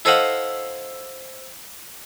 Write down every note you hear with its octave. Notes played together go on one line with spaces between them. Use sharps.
E4 A4 C5 D#5 F5 F#5